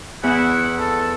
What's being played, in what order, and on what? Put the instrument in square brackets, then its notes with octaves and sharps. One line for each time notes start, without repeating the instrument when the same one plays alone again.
[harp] E2 [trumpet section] E4 F#5
[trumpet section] A4